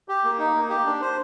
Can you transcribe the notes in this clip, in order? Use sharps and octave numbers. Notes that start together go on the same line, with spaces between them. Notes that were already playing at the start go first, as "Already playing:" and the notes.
G4
A#3
D#4
A#3
G4
D4
C5